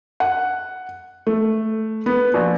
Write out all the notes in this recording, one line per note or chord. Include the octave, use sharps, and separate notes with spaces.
F#5
A3
B3
A#1